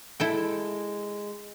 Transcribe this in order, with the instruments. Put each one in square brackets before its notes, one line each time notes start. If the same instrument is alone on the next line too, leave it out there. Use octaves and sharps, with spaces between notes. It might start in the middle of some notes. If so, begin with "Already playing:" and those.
[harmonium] G#3 [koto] E4 A4 G5